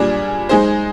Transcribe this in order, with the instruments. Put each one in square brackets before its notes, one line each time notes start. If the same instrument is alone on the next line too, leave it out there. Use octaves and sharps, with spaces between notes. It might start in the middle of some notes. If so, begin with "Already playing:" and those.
Already playing: [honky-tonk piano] A#2 G3 D4 G#4
G#3 D#4 G#4 C5